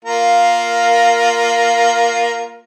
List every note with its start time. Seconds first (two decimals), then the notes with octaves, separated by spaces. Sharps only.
0.05 A#3 F4 A#4